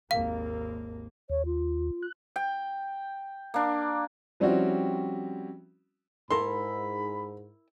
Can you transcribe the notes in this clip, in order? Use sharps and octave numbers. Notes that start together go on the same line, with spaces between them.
G#1 D#2 A#3 F5
D#2 C#5
F4
F#6
G5
A#3 D4
F3 G3 C4 C#4 E4 F#4
G#2 E4 A4 A#4 B5 C6